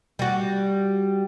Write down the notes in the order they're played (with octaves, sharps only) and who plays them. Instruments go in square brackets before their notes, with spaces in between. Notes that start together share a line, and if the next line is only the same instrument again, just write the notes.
[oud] G3 F#4